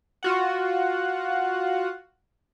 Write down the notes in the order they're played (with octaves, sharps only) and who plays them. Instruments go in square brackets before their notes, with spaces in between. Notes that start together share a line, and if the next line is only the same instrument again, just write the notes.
[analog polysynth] F4 F#4 F#5